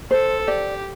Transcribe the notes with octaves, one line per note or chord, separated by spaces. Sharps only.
A4 C5
G4 D5